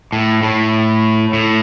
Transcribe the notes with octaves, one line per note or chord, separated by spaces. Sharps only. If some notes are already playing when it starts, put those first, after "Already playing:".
A2
A2
A2